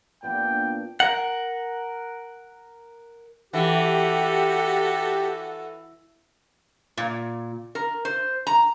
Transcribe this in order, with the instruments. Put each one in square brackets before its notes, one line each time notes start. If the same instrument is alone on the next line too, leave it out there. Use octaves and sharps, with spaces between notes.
[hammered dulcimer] A#2 B3 D4 [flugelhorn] G5
[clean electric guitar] A#4 F#5
[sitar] E3 [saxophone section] F#4 A4 [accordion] G4
[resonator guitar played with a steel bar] A#2
A#4
C5
A#5